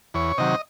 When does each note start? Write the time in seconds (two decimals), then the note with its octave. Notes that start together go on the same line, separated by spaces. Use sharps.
0.14 E2 C#5
0.38 C3 D#3 F#3 D#5